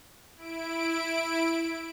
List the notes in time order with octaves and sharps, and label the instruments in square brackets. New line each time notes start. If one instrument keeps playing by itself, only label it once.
[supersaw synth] E4 D7